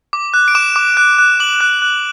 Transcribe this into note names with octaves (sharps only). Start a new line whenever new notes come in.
D6
F#6
D7
D6 E7
D6
F#6
F#6
D6 F#7
F#6
F#6